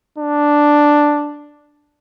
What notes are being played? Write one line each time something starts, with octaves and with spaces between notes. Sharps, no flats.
D4